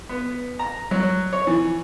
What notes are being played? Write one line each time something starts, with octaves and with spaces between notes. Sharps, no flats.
B3
A#5
F#3
C#5
E3